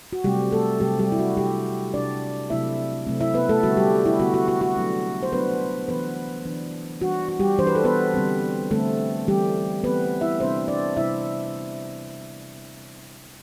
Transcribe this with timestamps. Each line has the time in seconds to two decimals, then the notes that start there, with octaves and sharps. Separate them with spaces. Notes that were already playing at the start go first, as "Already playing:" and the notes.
0.13 F#4
0.24 C3 F#3 G3 A3 C4 G4
0.52 A3 A4
0.80 C3 F#3 G3 A3 C4 G4
0.99 G3 G4
1.12 E4
1.19 F#4
1.37 C3 G3 D4 G4
1.94 C3 G3 D4 D5
2.50 C3 F#3 A3 C4 E4 E5
3.07 C3 F#3 A3 C4
3.20 E4 E5
3.34 B3 B4
3.49 A3 A4
3.63 D3 G3 B3 F#4
3.77 G3 G4
4.06 E4
4.19 D3 G3 B3 F#4
4.34 F#4
4.48 F#4
4.61 F#4
4.76 F#3 A3 D4
5.23 C5
5.32 F#3 A3 B3 D4 B4
5.88 E3 B3 D4 B4
6.46 E3 B3 D4
7.02 E3 G3 D4 F#4
7.29 F#4
7.40 G3 G4
7.59 E3 G3 D4 C5
7.67 B4
7.75 A4
7.85 B3 B4
8.14 D3 G3 C4
8.71 D3 G3 A3 C4 A4
9.27 E3 G3 A3 C4 G4
9.84 E3 A3 B3 C4 B4
10.21 E4 E5
10.40 C3 G3 B3 C4 D4 C5
10.68 D4 D5
10.97 C3 G3 B3 D4 E4 E5